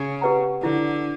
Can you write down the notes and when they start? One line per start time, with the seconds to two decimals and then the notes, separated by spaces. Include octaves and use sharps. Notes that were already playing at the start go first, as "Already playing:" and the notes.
Already playing: C#3
0.21 G4 B4 F#5 A#5
0.62 D3 E4